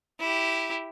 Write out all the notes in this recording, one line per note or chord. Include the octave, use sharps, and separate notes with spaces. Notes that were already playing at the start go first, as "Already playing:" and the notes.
E4 G4